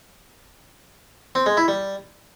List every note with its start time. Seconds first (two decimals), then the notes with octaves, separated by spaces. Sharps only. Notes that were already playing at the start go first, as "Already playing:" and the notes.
1.35 C4
1.46 G#3
1.57 E4
1.68 G3